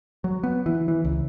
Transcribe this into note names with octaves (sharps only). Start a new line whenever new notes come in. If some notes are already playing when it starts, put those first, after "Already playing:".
F#3
B3
E3
E3
C#2